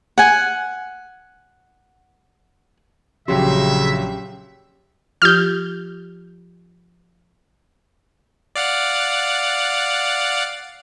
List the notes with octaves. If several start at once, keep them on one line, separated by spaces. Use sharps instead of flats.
F#5 G#5
A#1 C#3 F#3 C#4 G4 E5 C6
F3 F4 G4 F6 G6
D5 F5 F#5